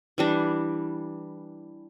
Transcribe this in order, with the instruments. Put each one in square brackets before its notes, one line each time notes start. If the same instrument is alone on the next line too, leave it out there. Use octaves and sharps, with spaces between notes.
[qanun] E3 G3 D4